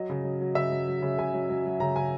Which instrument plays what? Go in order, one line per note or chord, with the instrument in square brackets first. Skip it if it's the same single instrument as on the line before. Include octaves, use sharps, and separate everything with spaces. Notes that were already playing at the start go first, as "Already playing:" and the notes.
Already playing: [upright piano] F#3 D#5
C#3
F#3
F#3
C#3 E5
F#3
F#3
C#3
C#3 G#5
F#3
F#3
F#3
C#3 A#5
C#3 G#5